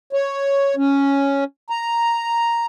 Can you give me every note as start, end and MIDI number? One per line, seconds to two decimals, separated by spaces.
0.13 0.75 73
0.77 1.44 61
1.70 2.66 82